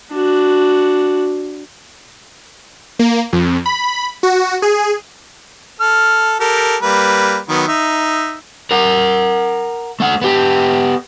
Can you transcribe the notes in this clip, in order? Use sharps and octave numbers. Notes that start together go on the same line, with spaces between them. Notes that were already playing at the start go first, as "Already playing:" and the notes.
D4 F#4
A#3
F2
B5
F#4
G#4
A4 F6
G4 A4 A#4
G3 A#3 B4
D#3 F#3 B3
D#4 E5
A#4 F#5
A3 F#5
B3 G4